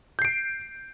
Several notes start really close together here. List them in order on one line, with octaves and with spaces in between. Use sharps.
G6 C7 D7